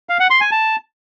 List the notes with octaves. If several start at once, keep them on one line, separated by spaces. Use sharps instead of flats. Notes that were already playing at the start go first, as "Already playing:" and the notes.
F5
F#5
C6
G#5
A5